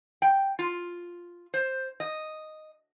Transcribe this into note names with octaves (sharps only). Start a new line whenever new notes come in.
G5
F4
C5
D#5